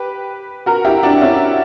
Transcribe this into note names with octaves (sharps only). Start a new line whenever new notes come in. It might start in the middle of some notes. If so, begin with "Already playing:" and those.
Already playing: G4 B4
F#4 A#4
E4 G4
D4 F#4
C#4 E4